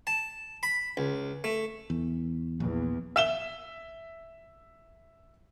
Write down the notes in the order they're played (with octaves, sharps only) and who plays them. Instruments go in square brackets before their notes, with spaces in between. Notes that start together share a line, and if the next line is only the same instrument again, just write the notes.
[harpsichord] A5
B5
C#2
A3
[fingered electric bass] E2
[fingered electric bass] A#1 [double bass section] E2
[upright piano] E5 E7 G7